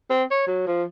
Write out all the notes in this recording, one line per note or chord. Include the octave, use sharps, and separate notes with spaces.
C4
C#5
F#3
F3